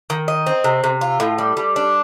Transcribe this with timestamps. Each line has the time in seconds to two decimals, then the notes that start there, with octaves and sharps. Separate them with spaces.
0.10 D#3
0.28 D#5
0.47 C4
0.64 C3
0.84 C3
1.01 F4
1.20 A2
1.38 G3
1.57 G3
1.76 D4